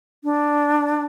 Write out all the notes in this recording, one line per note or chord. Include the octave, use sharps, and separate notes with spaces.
D4